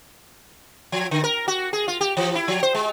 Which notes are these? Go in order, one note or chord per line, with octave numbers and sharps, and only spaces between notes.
F3
D3
A#4
F#4
G#4
F4
G4
E3
E4
F3
C5
G#3